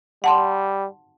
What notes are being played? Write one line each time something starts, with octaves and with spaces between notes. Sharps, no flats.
G3 F#5 A5 C6